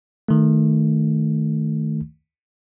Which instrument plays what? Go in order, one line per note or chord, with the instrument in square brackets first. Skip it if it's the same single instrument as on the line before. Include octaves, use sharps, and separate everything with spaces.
[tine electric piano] D#3 A3